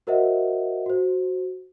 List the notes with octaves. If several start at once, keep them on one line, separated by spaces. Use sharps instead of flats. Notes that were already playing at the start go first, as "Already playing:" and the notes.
F#4 A#4 C5 D#5 E5 F#5
F#4 C5